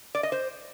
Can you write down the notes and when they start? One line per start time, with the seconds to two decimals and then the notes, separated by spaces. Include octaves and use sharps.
0.15 D5
0.23 D#5
0.32 C5